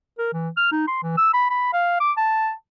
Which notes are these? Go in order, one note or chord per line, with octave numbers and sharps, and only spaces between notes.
A#4
E3
F6
D#4
C6
E3
E6
B5
B5
F5
D6
A5